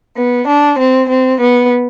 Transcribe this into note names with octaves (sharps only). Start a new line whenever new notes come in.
B3
D4
C4
C4
B3